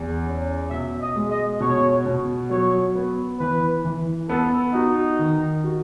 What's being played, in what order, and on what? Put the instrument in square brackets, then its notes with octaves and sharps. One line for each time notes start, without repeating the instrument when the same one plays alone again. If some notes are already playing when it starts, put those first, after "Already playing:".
Already playing: [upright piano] E2
C#4
[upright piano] B2 [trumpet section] E5
[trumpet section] D#5
[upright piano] G#3
[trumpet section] D#5
[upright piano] B2 [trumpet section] C#5
[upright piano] B2
[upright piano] F#3 [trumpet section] C#5
[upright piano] B3
[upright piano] E3 [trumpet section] B4
[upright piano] E3
[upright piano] B3 [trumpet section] A4
[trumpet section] D#4 [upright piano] F#4
[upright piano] D#3
F#4